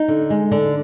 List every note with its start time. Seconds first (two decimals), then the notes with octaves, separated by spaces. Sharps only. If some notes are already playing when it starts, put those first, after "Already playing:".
Already playing: D#4
0.08 D3
0.30 G#3
0.51 D3 D4